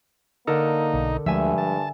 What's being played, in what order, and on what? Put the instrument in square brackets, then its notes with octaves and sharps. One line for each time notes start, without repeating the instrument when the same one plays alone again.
[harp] D3 A4 A#4 [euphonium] A#3 [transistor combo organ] D#4
[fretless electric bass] B1
[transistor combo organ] D2 [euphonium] G2 [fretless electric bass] F3 G#3 [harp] E5 G#5
[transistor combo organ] A5